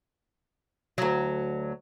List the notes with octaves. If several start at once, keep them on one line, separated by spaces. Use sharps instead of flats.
D2 F#3